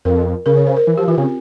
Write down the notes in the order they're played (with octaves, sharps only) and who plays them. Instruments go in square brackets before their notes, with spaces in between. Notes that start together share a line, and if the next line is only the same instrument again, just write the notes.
[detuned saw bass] F2 [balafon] A#4
[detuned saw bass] C#3 [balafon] A#4
[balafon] C#5
C5
A#4
[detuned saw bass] E3
[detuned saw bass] F3 [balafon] G4
[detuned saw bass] E3 [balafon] F4
[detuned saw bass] C#3 [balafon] C4